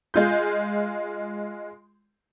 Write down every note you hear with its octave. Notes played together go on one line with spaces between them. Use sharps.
G#3 F4 G6